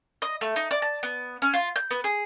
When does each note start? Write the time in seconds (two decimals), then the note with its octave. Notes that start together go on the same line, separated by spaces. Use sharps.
0.22 D#5
0.41 A3
0.56 D#4
0.71 D5
0.82 A5
1.03 B3
1.42 C#4
1.54 F4
1.76 G6
1.91 B3
2.04 G#4